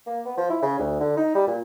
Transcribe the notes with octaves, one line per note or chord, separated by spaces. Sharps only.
A#3
B3
F3
E4
C#3
D2
D3
D#4
G3
A#2